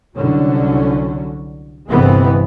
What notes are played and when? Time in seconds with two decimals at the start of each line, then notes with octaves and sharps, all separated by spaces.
0.15 C2 D3 F#3 C#4
1.89 G1 C3 E3 G#3 B3 C4